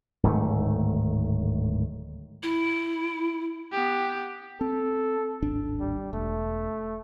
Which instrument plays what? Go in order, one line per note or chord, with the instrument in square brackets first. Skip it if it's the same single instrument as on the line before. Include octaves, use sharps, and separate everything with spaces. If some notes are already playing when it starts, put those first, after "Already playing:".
[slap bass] D1 G#2 D#3 A3
[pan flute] E4
[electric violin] B3 G4
[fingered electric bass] C4 [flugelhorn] A4
[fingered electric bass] D1 G#1 D4
[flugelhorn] G3
[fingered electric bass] E1 [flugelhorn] A3